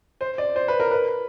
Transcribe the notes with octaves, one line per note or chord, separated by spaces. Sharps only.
C5
D5
C5
B4
A#4
B4